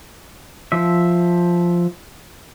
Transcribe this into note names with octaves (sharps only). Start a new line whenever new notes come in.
F3 E5